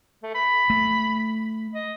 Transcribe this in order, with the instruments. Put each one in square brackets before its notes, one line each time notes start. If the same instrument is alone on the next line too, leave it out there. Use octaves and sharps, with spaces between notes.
[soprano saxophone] A3
B5
[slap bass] A3
[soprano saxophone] D#5